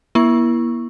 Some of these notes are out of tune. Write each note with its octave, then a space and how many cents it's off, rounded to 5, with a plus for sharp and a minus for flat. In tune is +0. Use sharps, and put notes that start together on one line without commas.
A#3 +45 E4 +0 C#6 +0